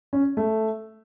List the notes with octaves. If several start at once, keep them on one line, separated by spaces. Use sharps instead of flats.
C#4
A3